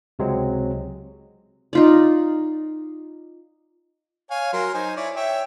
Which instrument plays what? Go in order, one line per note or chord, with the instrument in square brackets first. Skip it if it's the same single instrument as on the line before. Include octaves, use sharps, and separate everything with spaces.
[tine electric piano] C#2 C3 F#3 G#3 C4
[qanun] D#4 F4 D5
[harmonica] C#5 F5 G#5
F#3 A#4 C6
D#4 C5 G#5
E4 C#5 D5
C#5 E5 G5